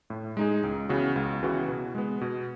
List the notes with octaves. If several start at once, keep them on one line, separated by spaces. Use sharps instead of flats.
A2
G#3 D#4 G#4
C#2
C#3 E3 B3 F#4
C#2
C#3 E3 B3 F#4
B2
G#3 B3
B2